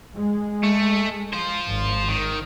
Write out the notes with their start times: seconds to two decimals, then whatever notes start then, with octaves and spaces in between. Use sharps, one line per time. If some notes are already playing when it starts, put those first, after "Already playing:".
0.16 G#3
0.63 A3
1.33 F4 C5
1.66 G#1
2.09 D#3